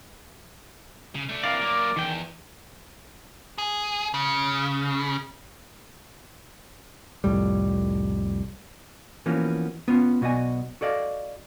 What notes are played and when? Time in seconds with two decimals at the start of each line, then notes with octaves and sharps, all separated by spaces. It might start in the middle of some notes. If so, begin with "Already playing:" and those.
1.15 C#3
1.29 A3 D4
1.44 C3 E3 A#4 D5 F5
1.61 F#3 A#3 D6
1.96 E2 D#3 G5
3.58 G#4
4.14 C#3
7.24 C2 F2 A2 G3
9.26 E3 F3 A#3 B3 C#4 F#4
9.88 B3 C#4 F4
10.21 B1 B2 F#4 D5 D#5 G#5
10.81 F#4 A4 D5 D#5 F5